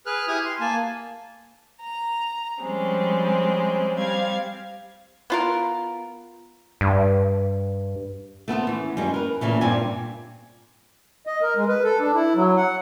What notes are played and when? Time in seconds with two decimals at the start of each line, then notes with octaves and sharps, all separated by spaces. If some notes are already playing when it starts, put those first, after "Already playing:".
0.06 G#4 B4 F6 F#6
0.28 E4 G4 G#5 D#6 F6
0.45 C6
0.60 A#3 G#5 A5
1.80 A#5
2.61 F3 G3 G#3 C4 C#4
3.96 G3 C4 F5 G#6
5.30 B3 F4 A#4
6.81 G2
8.48 A3 B3 A4 C5
8.67 E3 C#4
8.97 F#2 G3 G#3
9.14 A#4 B4
9.41 A#2 C#3 E3 A3
9.61 G2 A#2 A#3 C4 G#5
11.27 D#5
11.42 A#4
11.56 G#3
11.68 B4
11.84 A4
12.00 D4
12.15 E4
12.35 F#3
12.57 F#5